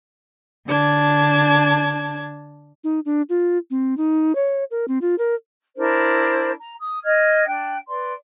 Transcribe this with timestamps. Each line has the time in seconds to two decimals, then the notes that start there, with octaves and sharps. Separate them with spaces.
0.67 D3 D4 A5 G#6
2.84 D#4
3.05 D4
3.29 F4
3.70 C4
3.97 D#4
4.35 C#5
4.71 A#4
4.88 C4
5.01 F4
5.18 A#4
5.77 D4 E4 A#4 C5
6.60 A#5
6.81 D#6
7.04 D#5 F6 G#6
7.46 D4 G5 F#6
7.88 B4 D5 C6